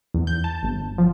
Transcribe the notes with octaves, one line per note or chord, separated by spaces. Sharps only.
E2
G6
A5
G1
F3